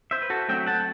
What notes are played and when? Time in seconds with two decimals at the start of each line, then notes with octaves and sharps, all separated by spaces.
0.11 C5 E5
0.22 B4
0.30 F#4 A4
0.48 D3 F#3 A3 C4 E5 G5
0.67 F#5 A5